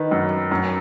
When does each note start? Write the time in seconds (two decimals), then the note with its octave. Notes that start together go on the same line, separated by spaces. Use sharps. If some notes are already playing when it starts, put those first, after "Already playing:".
Already playing: D#3 B4
0.11 F#2
0.51 F#2